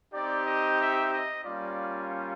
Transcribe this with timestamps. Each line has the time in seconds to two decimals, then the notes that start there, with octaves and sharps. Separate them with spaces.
0.13 C4 D#4 G4 D5
0.46 D#5
0.80 E5
1.12 D#5
1.45 G3 A#3 C#4 F4 D5